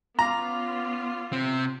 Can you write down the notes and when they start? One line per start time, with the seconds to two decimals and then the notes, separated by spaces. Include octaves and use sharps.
0.19 B3 C#4 F4 F5 A#5 D6
1.33 C3 C4